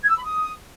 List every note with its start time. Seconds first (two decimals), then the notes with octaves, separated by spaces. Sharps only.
0.02 G#6
0.10 E6
0.17 B5
0.24 D#6